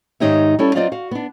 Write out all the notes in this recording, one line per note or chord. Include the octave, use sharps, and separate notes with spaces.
G#2 D#3 D#4 G4 C#5 E5
G3 C#4 E4 A4
F#3 C4 F4 D5 D#5 F5
F#4 F5
B3 D4